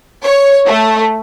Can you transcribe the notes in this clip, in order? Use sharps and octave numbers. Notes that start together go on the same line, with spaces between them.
C#5
A3